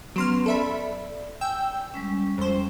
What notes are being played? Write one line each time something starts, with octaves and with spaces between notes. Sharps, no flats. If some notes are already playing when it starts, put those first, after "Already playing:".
F#3 B3 C#4 B4 C6 F6
A4 D5 E5 B5
G5 G#5 E6
G3 G#3 C#4
F2 C5